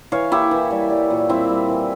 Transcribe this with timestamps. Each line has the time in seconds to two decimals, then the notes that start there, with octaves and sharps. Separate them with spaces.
0.12 E3 C#5 F5
0.32 A#3 E4 G4
0.51 E3
0.71 G3
0.90 G3
1.10 A#2
1.29 G3 C4 E4
1.49 G3
1.68 E3